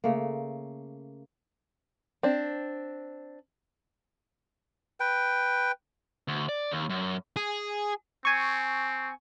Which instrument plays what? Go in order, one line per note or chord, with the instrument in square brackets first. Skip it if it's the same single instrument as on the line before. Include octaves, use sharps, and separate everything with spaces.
[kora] C#3 A3 A#3
[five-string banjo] C4 D4
[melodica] B4 G5
[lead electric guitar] D2
D5
D#2
F#2
[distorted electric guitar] G#4
[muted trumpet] C4 [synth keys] G#5 C#6